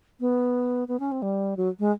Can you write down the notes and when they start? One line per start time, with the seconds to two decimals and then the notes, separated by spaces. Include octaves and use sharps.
0.20 B3
0.88 B3
1.00 C#4
1.12 C4
1.22 G3
1.57 F#3
1.79 G#3